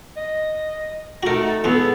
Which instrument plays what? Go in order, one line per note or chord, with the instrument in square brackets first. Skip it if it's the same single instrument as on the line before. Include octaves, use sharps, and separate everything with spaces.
[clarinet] D#5
[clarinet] A3 [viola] D#4 A4 [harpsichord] F#4 A#4
[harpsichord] E2 G#2 C#3 [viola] B3 G#4 [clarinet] A4